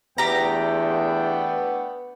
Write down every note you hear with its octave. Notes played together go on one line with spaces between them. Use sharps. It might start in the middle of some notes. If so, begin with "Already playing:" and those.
E2 A3 B3 D4 G4 G5 A#5